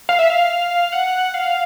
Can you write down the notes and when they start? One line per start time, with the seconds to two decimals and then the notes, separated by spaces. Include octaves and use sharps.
0.09 F5
0.19 E5
0.30 F5
0.92 F#5
1.34 F5